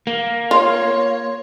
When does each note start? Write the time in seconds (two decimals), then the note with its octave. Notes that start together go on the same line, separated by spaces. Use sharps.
0.07 A#3
0.51 F4 C#5